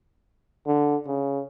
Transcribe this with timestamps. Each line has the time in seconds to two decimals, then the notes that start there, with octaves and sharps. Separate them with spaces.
0.66 D3
1.07 C#3